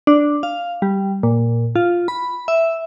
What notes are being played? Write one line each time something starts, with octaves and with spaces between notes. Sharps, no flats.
D4
F5
G3
A#2
F4
B5
E5